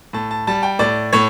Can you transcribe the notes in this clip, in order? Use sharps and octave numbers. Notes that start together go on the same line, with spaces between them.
A2 A5
A5
G3 A5
G5
A2 D5
A2 C#5